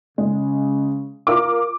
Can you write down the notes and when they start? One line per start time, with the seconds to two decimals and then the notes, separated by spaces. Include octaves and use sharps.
0.18 C#3 G#3
1.27 F4 A#4 D6